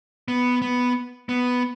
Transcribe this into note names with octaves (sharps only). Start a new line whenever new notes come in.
B3
B3
B3